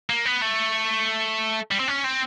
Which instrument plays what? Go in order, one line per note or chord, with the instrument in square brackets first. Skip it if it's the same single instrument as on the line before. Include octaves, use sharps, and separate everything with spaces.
[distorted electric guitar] A#3
B3
A3
G3
C4
C#4
C4